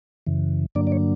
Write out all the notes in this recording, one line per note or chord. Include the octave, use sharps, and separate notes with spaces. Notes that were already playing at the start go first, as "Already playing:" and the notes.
F#2 C#3 E3
G2 D3 F#3 A#3 D4 D5
D5
C#5